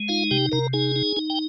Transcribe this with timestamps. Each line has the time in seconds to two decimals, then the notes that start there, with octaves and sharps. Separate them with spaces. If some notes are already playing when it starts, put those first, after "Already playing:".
Already playing: G#3
0.08 D#4 F4 F5
0.31 C3 G4 G5
0.52 C3 A#4 A#5
0.73 D#4 G#4 G#5
0.96 D#4
1.17 D#4
1.30 G5